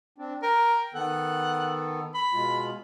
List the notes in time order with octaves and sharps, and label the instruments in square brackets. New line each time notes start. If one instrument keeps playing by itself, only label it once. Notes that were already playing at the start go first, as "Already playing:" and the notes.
[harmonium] C4 D4
[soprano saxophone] A#4 [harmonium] G5
[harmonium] D#3 B3 A4 [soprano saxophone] F#5
[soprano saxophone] B5
[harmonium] B2 G#3 F4